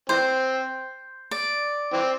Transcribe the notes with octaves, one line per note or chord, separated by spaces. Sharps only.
E3 C4 C5
D5
E3 C4